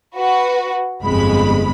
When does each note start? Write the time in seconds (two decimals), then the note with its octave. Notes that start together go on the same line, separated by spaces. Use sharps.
0.16 F#4 B4
1.03 G1 F2 G#3 B5